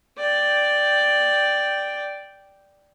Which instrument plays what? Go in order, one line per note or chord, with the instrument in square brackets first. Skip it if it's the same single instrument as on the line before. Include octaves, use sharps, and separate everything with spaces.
[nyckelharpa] D5 G5